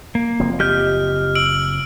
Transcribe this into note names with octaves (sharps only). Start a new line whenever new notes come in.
A#3
F#1 F3 C4
G4 D#5 F6 G6
E6 D7 F#7